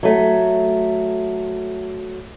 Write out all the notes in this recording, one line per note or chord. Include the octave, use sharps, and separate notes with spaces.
F#3 A3